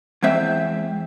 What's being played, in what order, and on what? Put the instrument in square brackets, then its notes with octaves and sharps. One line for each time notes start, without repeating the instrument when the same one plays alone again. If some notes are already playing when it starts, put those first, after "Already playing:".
[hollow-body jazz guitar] E2 G#3 C4 E5